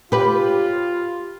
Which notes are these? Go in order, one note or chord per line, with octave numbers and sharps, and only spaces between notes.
F4 G4 B4